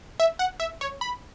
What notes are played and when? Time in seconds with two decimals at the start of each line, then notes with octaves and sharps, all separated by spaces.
0.20 E5
0.39 F#5
0.60 E5
0.81 C#5
1.01 B5